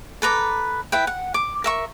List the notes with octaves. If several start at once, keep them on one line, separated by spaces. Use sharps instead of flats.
A4 B4 A#5 D6
E4 B4 G5
F#5
D6
A#4 E5 C#6